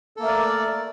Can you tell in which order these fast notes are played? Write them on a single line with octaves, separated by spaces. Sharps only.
A4 A#3 A3 A#4 D5